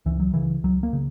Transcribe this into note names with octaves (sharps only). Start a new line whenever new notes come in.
C#2 E3
F#3
C#3 E3
C#2 F#3
A#3
C#3